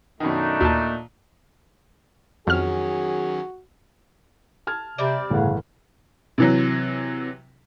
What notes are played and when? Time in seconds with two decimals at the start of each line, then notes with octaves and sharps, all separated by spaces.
0.20 F#2 B2 D#3 A3 D4 D#4
0.61 D#2 A#2 A#3 F#4 A5
2.47 F2 D#3 F#3 C#4 F#4 G#4 F6
4.67 A5 F6 G#6
4.98 C3 G3 C4 D5
5.30 G1 A2 C#3 E3 F#5
6.38 C3 E3 F#3